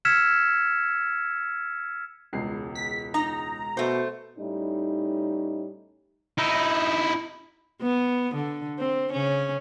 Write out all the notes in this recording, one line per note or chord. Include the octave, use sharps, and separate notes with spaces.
E6 F6 G#6 B6 C#7 E7
E1 C#2 C7
B6
D#4 A#5
B2 A3 C5
A2 G3 C#4 D#4
D#4 E4
B3
D3
C4
C#3 C#4